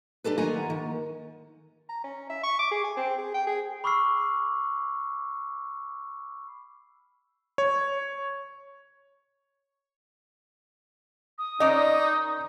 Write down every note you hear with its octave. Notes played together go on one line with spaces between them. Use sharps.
D4 G4 A4 B4
D#3 A#3 F4 F#5 G#5 A#5
D#3
A#5
C#4
E5
C#6
D6
G#4
G#5
C4
G#4
G5
G#4
B5 C#6 D6 E6 F6 C7
C#5
D#6
D#3 C#4 D#4 D5 D#5